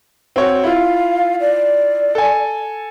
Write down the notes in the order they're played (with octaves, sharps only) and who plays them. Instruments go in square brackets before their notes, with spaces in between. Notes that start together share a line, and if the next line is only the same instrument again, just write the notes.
[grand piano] C4 F#4 C#5
[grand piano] E4 F4 [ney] F5
[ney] D5
[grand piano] A4 G#5